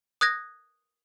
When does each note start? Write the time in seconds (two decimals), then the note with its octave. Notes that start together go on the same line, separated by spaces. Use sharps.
0.21 D#6 F#6 G#6 A#6